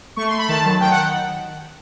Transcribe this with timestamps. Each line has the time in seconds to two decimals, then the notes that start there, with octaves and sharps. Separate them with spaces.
0.16 A3 C#6
0.27 C6
0.33 A3
0.38 B5
0.49 D#3 A5
0.65 F#3
0.80 D#3 G5
0.91 F#5